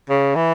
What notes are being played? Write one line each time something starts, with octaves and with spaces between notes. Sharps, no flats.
C#3
E3